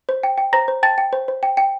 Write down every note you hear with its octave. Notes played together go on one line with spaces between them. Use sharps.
C5
G5
G5
C5 A#5 A#6
C5
G5 A5 A6
G5
C5
C5
G5
G5